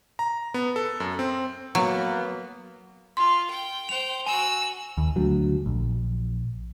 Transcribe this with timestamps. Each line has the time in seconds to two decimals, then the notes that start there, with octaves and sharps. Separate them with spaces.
0.19 A#5
0.54 B3
0.76 A4
1.00 F#2
1.19 C4
1.75 F#3 A#3 B3
3.17 F4 C6
3.50 G5
3.89 C5 G5 F7
4.27 F#4 G#5 E6
4.97 D#2
5.16 D2 F#3
5.66 A#1